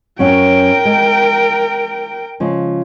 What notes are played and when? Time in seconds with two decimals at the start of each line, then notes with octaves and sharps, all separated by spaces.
0.19 F#2 C#4 A#4 F#5 G5
0.85 G#3
2.40 C#3 F3 G#3